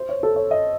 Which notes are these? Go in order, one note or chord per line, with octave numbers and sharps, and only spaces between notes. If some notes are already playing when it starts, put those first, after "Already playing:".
Already playing: C5
C#5
A4
C#5
D#5